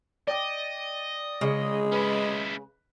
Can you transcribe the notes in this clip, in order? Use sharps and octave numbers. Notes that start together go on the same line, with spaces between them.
D5 D#5 G5 D6
C#3 G#3
C#4 E4 B4 D#5 B5